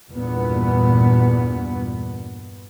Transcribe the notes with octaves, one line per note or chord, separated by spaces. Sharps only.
E2 G2 A#2 B3